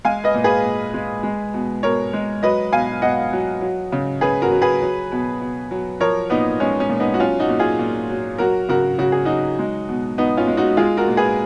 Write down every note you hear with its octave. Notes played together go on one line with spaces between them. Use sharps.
G#3 F5 G#5
B4 D#5
A#2
G#4 B4
A#2
G#3
G#3
B2
B2 A#4 C#5
G#3
F#3 B4 D#5
B2 F5 G#5
B2 D#5 F#5
F#3
F#3
C#3
C#3 G#4 B4
F#4 A#4
F#3
G#4 B4
F#3
B2
B2
F#3
F3 A#4 C#5
A#2 B3 D#4
G#3 C#4
C#4
A#2
B3 D#4
F#4
F#3 C#4 F4
D#4 F#4
A#2
F4 G#4
A#2
F#3
F#3 F#4 A#4
C#3 F#4 A#4
C#3 F#4
G#4
F#3 D#4 F#4
G#3
B2
B2 B3 D#4
C#4 F4
G#3
D#4 F#4
G#3 F4 G#4
F#4 A#4
A#2
G#4 B4